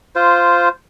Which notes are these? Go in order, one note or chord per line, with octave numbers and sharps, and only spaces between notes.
F4 C5